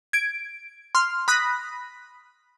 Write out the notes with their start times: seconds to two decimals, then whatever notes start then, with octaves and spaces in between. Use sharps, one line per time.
0.13 G#6 D7
0.95 C6 F6
1.28 B5 D#6 F#6 A#6 B6